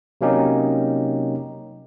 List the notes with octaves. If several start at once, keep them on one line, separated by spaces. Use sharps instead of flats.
C3 F#3 A#3 C#4 D#4 G4